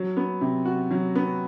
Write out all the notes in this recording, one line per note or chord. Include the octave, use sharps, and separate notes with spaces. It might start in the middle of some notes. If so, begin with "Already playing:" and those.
Already playing: F#3
B3
C3
F#4
F#3
B3